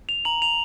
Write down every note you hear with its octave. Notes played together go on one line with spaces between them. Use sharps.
F7
A#5 F#7
F7